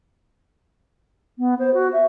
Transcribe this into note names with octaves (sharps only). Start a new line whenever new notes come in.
B3
C5
F#4
E5